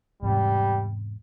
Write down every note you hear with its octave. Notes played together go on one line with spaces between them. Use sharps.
E2 G#2 C3 G3